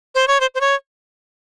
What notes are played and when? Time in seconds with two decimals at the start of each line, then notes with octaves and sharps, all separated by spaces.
0.15 C5
0.28 C#5
0.40 C5
0.55 C5
0.61 C#5